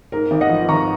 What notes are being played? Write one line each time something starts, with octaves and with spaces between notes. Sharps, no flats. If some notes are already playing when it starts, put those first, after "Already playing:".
G#2 A#4
G#1
D#5 F#5
F3
G#1 A#5 C#6